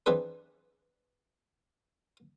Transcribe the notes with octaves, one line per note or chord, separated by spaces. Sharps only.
E3 C4 D4 G#4 B4